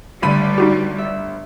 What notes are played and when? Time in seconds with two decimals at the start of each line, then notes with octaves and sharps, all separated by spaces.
0.22 G1 D3 G3 A3 B5 D#7
0.58 D#4 F#4 G4
0.98 E5